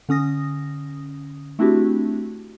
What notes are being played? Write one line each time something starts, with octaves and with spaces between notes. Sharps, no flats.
D3 C#4 D#6 A#6
A3 C4 D4 E4 F#4 G4